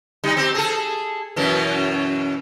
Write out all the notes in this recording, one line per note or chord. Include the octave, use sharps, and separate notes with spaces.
G3 D#4
C4 G4
G#4 A4
F#2 B2 E3